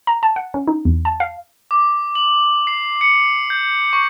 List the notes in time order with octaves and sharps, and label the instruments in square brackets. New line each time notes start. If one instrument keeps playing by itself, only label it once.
[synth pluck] A#5
A5
F#5
C#4
D#4
E2
A5
F5
[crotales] D6
F#7
C7
C#7
G6
C#6